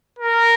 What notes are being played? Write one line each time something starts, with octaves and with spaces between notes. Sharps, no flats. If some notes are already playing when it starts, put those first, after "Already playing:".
A#4